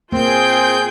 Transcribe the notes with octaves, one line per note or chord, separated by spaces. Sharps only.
A#3 C4 F4 G#4 G5 G6